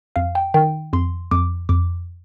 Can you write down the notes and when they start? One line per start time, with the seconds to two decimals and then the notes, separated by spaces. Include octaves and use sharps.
0.16 F2 F5
0.35 G5
0.54 D#3 G5
0.93 F2 C6
1.31 F2 D6
1.69 F2 D6